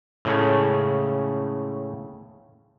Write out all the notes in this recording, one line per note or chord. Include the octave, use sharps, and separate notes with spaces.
A2 C#3 G#3 A3 C#4